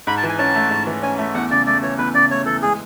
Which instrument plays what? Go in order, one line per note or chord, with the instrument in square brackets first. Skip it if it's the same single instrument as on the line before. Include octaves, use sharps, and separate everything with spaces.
[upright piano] G#2 [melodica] B5
[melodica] A5
[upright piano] E3
[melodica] G#5
[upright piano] C#4 [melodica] A5
[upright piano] A3
G#2
E3
[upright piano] C#4 [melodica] G#5
[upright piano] A3 [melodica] E5
[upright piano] E2 [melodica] F#5
[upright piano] C#3 [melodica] D5
[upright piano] A3 [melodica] D5
[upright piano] E3 [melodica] C#5
[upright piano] E2 [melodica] B4
[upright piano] C#3 [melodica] D5
[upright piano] A3 [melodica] C#5
[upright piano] E3 [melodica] A4
[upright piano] G#3 [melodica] G#4